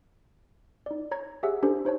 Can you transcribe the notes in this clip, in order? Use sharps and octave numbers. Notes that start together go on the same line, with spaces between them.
D#4 D5
C#5 A#5 G#6
G4 G#4 C#5 E5 F#5 E6
C#4 D4 G4 A4 C5
D#4 C5 C#5 A5